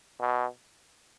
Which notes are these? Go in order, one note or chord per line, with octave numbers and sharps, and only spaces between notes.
B2